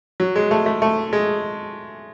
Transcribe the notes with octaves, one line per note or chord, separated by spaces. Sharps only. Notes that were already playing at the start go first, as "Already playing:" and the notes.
F#3
G#3
A3
A3
A3
G#3